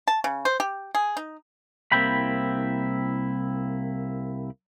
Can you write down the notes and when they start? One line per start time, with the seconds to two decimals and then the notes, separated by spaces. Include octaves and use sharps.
0.08 A5
0.24 C#3
0.45 C5
0.60 G4
0.95 G#4
1.17 D#4
1.92 C2 A#3 C4 E4 G5 B5